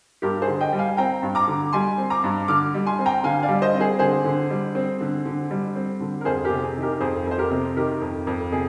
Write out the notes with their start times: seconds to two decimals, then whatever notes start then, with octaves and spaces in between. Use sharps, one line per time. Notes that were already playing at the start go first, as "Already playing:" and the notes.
0.22 G2 G4 A#4
0.42 G#4 C5
0.48 D3
0.60 D#5 G5
0.73 G3
0.79 F5 G#5
0.97 C4 G5 A#5
1.22 G2
1.35 A#5 D6
1.48 D3
1.73 G3 G#5 C6
1.98 C4
2.10 A#5 D6
2.24 G2
2.48 D3 D6 F6
2.74 G3
2.86 G#5 C6
2.99 C4
3.06 G5 A#5
3.24 D3 F5 G#5
3.43 D5 F5
3.49 G3
3.62 C5 D#5
3.74 C4
3.80 G#4 C5
3.99 D3 G#4 C5
4.24 D3
4.50 G3
4.75 C4
5.01 D3
5.25 D3
5.51 G3
5.76 C4
6.00 D3
6.21 A#4
6.25 F2 G#4 C5
6.44 G4 A#4
6.50 C3
6.63 G#4
6.76 D#3
6.82 G4 A#4
7.00 F2 G#4 C5
7.27 F2 C5
7.38 G4 A#4
7.51 C3
7.76 D#3 G4 A#4
8.01 F2
8.27 F2
8.52 C3 G#4